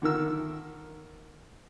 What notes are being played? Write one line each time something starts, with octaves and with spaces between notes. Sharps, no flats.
D3 D#3 A#4 E6